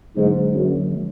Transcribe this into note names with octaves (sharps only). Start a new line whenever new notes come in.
G#2 D3 F#3 A#3 D4
F#2
F3 G#3